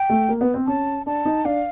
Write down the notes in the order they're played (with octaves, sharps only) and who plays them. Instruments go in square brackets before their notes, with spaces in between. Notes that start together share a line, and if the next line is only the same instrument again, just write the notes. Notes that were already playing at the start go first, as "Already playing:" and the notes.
Already playing: [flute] G5
[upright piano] A3
A#3
B3
C4
[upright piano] C#4 [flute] A5
[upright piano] D4 [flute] A5
[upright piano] D#4
[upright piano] D4 [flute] F5